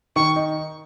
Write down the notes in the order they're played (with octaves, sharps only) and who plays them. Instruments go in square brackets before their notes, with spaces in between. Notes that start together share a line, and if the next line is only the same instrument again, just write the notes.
[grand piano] D#3 [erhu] C#6
[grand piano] D#4